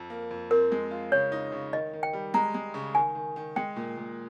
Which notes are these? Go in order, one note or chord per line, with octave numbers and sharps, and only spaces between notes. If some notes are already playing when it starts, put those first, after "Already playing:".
Already playing: F2
A#3
F2
C4 A#4
G#3
F4
C#3 C#5
D#4
C#3
D#3 D#5
D#3
G5
G3
G#3 A#5
G#3
C#3
D#3 G#5
D#3
D#3
G#3 G5
A#2
A#2